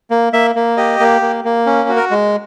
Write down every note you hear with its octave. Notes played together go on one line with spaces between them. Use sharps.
A#3
A#3 E5
A#3
G4 D#5
A#3
A#3
A#3
C#4
F#4
A#4
G#3